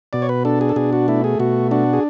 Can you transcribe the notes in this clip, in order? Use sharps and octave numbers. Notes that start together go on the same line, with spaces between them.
B2 D5
C#5
B4
D4 A4
G#4
A4
B2 G#4
F#4
A3 E4
G#4
B2 F#4
D4 F#4
G#4